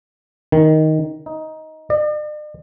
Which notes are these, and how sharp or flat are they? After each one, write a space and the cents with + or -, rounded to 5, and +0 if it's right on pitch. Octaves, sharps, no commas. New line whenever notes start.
D#3 +5
D#4 +15
D5 +45